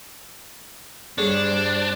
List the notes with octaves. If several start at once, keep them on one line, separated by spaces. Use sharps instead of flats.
G2 G3 D4 G#4 C5 C#5